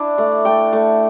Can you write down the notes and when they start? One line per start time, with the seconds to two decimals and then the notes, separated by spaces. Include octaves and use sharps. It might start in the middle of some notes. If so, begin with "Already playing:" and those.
Already playing: D4 E4
0.18 A3
0.45 A3 G5
0.73 A3